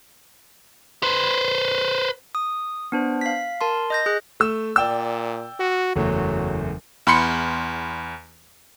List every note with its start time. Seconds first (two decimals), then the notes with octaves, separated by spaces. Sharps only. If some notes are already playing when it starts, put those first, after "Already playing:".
1.03 B4 C5
2.35 D#6
2.92 B3 D4 C5
3.21 F5 B6
3.61 A#4 A5 C6
3.90 D#5 G6 A#6
4.06 G#4 F#6
4.40 A3 E6
4.76 A#2 D5 G5 E6
5.60 F#4
5.96 F#1 E2 F#3 A3
7.07 E2 B5 C6 C#7